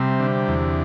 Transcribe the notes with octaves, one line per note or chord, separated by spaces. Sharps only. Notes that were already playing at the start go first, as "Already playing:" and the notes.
Already playing: C3 G3 C4
D3
E2